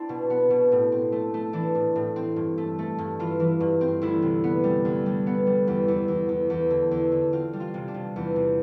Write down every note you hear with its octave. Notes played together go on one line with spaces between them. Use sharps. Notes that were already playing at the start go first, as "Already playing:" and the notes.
Already playing: C4 D4 E4
B2
B3
B2
A2
C4
A3
A3
E3 D4
A2
A2
C4
G2
A3
A3
G2
E3 F4
E3
G2
C4
D2 E4
C3
B3
G3
D2
G3
B3
G3
E2
E2
E2
E2
E2
D3
E2
D3
C4 F4
G3
F4
C3
D4
C3
E2
C3